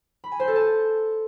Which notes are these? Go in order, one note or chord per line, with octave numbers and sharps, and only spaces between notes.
B5
G#5
C5
A4
A5